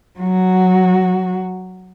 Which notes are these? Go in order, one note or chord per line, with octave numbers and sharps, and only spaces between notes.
F#3 F#4